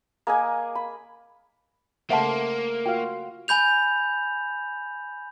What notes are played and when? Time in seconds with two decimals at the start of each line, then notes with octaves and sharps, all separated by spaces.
0.27 A#3 G#4 D#5 G#5
0.75 B5
2.10 C#3 A3 A#3 C5 E5 F#5 A5
2.86 F4 F#4 F5 G5
3.48 G#5 B5 G6 F7